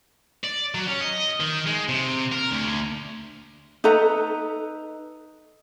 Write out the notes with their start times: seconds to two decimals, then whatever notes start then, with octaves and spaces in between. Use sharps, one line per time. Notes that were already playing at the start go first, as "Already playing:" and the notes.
0.44 D5
0.75 F#3
0.87 C#4
1.01 D#5
1.40 D#3
1.66 G#3
1.89 C3
2.32 A#4
2.51 D2
3.84 D#4 A4 B4 A#5